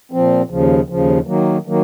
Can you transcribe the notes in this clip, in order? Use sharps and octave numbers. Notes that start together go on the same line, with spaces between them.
A#2 F3 C4
D#2 C#3 F3
D#2 C#3 F3
D#3 F#3 A#3
D#3 F#3 A#3